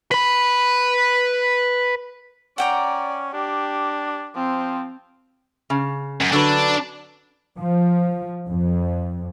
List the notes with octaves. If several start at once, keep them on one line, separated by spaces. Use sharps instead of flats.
B4 B5
C#4 D5 F#5 G5 A#5
D4 G4
F3 C4
C#3
F#2
D3 F#3 D4 B4
F3
F2